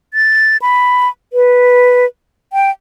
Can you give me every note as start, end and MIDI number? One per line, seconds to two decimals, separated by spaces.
0.14 0.57 93
0.62 1.08 83
1.33 2.05 71
2.53 2.70 79